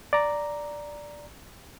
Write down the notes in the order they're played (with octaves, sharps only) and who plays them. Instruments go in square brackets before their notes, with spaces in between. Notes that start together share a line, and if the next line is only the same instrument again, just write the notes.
[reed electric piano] D5 A#5